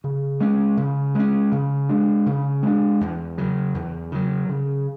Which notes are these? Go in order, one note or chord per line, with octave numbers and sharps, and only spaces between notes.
C#3
G#3 C#4
C#3
G#3 C#4
C#3
G#3 D4
C#3
G#3 D4
E2
C#3 F#3
E2
C#3 F#3
C#3